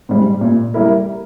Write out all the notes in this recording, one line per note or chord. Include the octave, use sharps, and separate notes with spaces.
G#2 G3
A#2
G3 A#3 E4 A#4